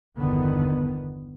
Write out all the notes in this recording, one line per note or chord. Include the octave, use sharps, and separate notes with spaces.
G1 E2 D3 D#3 B3